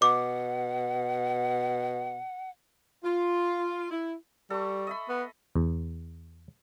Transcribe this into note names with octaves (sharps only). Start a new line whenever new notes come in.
B2 F#5 D6
F4
E4
G3 A4 C#6
D#5 E5 B5
B3
E2